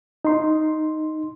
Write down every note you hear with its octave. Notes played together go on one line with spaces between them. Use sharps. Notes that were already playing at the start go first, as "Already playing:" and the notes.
D#4 C6